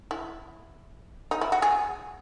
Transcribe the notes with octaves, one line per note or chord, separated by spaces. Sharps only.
E4
D#4
E4
F#4
G#4